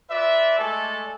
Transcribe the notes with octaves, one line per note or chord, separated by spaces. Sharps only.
F4 B4 D5 E5
G#3 A3 A4 D5 G#5 A5